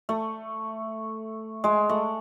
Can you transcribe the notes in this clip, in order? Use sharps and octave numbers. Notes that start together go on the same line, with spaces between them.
A3
G#3
A3